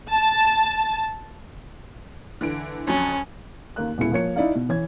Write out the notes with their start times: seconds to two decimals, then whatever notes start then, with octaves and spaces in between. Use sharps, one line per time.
0.11 A5
2.41 D3 E3 D7
2.87 F2 F#3 C#4
3.76 D#2 A#3 F#6
3.98 D#1 B2 G#3 E4 C#7
4.12 F3 A#3 C#5 C#7
4.36 D#4 E4 D5 F5
4.55 B2
4.69 E3 C#5 G#6